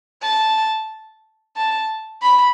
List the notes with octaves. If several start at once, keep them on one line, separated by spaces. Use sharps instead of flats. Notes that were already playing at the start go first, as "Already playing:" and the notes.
A5
A5
B5